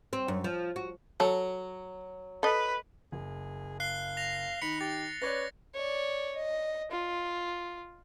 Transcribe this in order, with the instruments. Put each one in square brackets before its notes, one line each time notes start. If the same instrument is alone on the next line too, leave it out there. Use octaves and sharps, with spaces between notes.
[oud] C4
F#2
F3
F#4
[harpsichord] F#3 [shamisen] A4
[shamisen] A4 D#5 [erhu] B4
[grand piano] F#1 [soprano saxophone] G#4
[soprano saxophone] F5 [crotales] F#6 C7 G7
[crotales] A#6 F7
[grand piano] D#3 [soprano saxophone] B5 [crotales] C#7
[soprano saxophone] G4 [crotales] A6
[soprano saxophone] C#4 [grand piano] B4 C#5 D5 [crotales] A#6
[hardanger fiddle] C#5 D5
D#5
F4